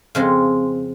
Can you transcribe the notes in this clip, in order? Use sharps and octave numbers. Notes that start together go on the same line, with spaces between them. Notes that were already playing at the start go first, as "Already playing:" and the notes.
F2 C#3 F3 G#3 C4